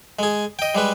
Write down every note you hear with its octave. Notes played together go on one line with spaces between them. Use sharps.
G#3 G#4
D#5 G5
G3 G#3 B4